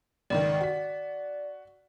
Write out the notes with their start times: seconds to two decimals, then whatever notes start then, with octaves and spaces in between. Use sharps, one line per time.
0.30 C#2 G#2 D#3 D5
0.61 F#4 B6